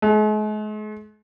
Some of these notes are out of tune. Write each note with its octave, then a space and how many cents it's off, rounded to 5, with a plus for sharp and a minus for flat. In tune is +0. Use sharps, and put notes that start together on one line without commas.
G#3 +45